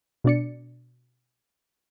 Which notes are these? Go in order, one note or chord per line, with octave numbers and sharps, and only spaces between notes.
B2 D4 D5 C#7